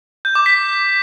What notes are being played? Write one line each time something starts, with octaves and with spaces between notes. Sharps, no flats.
G6
D6
B6